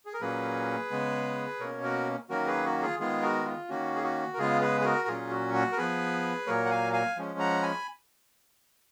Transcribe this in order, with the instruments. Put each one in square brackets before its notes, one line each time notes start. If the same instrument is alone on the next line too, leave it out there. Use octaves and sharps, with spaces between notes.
[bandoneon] G#4
A#4
A#2 F#3 A#3 C#4 G#4 B4
C#3 G#3 B3
B2 A#3 C#4 A#4 C#5
F#4 A#4
D#3 F#3 A#3 C#4 F#4 A#4
G#4 B4
F#4
F4 G#4
D#3 G#3 B3 F4 G#4
F#4 A#4
F4
D#3 A#3 C#4 F#4
G#4
F#4
A#4
C#3 G#3 B3 F4 G#4
G#4 B4
G#4
F#4 A#4
A#2 F#3 C#4 F4 G#4
F#4
F#4
A#4
F3 B3 G#4 B4
A#2 F#3 A#3 A#4 C#5
F#5
F5 G#5
F5 G#5
F3 G#3 C#4
F#5 A#5
G#5 B5